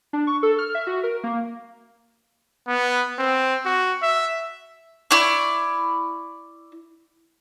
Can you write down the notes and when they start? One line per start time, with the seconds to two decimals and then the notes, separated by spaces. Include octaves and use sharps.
0.13 D4
0.27 C#6
0.43 A4
0.58 F6
0.75 E5
0.87 F#4
1.03 A#4
1.24 A#3
2.68 B3
3.19 C4
3.66 F#4
4.03 E5
5.11 E4 D5 C#6